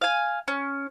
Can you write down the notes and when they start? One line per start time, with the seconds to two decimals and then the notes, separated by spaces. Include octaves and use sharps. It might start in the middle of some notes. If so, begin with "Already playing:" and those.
0.01 F5 G#5
0.48 C#4